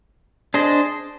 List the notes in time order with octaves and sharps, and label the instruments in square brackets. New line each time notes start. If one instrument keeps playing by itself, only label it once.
[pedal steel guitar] D4 G#4 C5 D#5